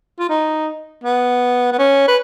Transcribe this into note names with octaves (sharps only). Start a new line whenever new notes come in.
F4
D#4
B3
B3
C#4
B4